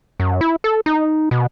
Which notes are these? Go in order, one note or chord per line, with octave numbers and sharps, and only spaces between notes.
F#2
E4
A4
D#4
B2